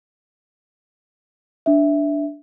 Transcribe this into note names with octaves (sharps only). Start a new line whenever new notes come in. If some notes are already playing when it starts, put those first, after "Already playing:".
D4 E5